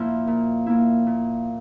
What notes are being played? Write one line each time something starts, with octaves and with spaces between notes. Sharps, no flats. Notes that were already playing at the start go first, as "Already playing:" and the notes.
Already playing: A#2 F3 A#3 E4
A#2
F3 A#3 E4
A#2